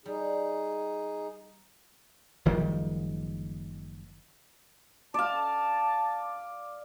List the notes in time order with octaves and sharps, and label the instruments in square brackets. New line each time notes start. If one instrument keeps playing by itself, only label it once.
[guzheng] G3 [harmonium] D#4 G#4
[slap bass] F#1 D#3 F3 G3
[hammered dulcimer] D5 F5 [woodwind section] A5